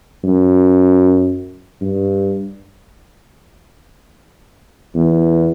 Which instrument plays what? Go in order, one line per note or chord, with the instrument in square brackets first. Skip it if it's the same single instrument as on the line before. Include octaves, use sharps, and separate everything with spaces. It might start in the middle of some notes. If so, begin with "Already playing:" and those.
[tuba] F#2
G2
E2